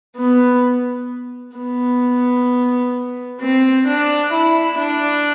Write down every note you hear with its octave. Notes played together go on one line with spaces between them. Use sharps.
B3
B3
C4
D4
E4
D4